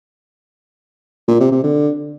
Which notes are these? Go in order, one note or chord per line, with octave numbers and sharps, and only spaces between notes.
A#2
C3
C3
D3